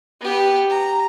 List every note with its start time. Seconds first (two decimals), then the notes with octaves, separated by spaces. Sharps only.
0.21 B3 G4
0.69 A#5